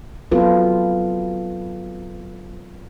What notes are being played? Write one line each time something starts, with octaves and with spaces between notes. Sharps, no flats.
F#3 B3 C4 F4 A4 B4